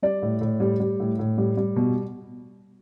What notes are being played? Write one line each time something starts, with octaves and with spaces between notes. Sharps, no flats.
G3 D5
A2
A2
G3
G3
A2
A2
G3
G3
B2